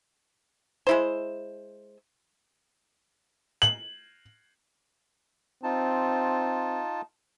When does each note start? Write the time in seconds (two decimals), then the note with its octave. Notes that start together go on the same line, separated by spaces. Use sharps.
0.87 G#3 E4 C5
3.62 F#7
5.63 C4 D#4 F4 A5